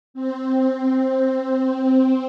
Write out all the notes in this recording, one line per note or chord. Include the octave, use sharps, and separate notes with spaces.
C4